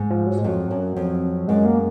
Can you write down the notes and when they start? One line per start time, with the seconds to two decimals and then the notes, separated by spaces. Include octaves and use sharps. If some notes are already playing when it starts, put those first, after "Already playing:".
Already playing: G#2
0.11 F3
0.27 F#3
0.38 G#3
0.44 F2 F#3
0.71 F#2
0.96 F2
1.48 F#2 G#3
1.65 A#3